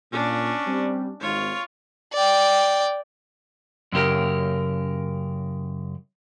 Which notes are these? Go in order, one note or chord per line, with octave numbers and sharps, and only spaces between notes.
A#2 C#4 D4
G3 C4
G#1 F4 C#5
D5 G5
F#2 C#3 G4 A#4